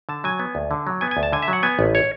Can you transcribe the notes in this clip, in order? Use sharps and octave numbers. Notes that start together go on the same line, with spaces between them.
D3 A5
F#3 G#5
B3
D2
D3
F#3
B3 G#5
G#5
D2
A5
D3 G#5
E5
F#3
F#5
B3 G#5
A1 B4
C#5